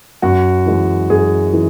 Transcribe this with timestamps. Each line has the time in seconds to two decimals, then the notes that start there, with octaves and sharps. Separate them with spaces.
0.22 F#2 F#4
0.66 E3 G#3
1.10 F#2 G#4
1.53 E3